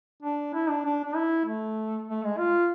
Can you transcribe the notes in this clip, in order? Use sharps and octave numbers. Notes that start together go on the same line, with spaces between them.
D4
E4
D4
D4
D4
E4
A3
A3
G#3
F4